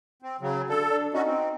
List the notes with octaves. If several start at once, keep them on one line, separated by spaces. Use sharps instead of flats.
C4
C#3 F#3
D3 A4
D4
C#4 D#4 F#4
C4